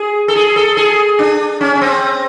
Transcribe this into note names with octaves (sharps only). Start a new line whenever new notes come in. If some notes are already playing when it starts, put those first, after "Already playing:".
Already playing: G#4
A4
G#4
A4
G#4
D4
C#4
C#4
C4